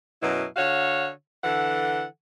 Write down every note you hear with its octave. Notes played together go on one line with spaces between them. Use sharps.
F#2 B2 F#3 E4
D3 F#4 C#5 F5
D3 E3 A4 F#5